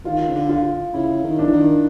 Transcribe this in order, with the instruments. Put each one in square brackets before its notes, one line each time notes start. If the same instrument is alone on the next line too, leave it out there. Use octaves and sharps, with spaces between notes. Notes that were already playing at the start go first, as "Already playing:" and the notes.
[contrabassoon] D#3 [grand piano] F4
[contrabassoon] C#3
D3
[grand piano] F4
[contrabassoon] C#3 [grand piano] E4
[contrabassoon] D#3
[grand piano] D4
[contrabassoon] E3
D#3